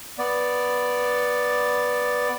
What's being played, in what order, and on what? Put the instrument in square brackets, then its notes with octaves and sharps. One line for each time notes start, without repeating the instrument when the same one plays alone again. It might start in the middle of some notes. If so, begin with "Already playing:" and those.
[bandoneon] B3 D5